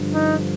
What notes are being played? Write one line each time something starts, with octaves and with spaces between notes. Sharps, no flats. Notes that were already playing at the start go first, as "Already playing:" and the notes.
Already playing: G2 D3 F3
D#4